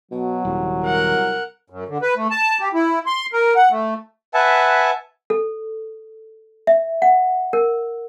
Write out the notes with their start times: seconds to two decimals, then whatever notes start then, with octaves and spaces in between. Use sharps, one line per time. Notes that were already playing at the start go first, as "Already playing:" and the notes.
0.11 B2 F#3
0.45 D#1 C2
0.85 A#4 F#5
1.70 F#2
1.88 D3
2.02 B4
2.16 A3
2.31 A5
2.60 G4
2.74 E4
3.06 C6
3.33 A#4
3.56 F#5
3.71 A3
4.34 B4 E5 F#5 G#5 A5
5.30 A4
6.67 E5
7.02 F#5
7.53 A#4